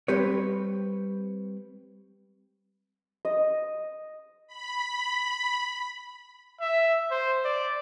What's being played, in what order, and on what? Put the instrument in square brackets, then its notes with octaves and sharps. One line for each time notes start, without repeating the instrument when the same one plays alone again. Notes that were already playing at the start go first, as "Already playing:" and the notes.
[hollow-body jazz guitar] G3 C4 G4 B4 C#5
[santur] D#5
[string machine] B5
[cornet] E5
C5
D5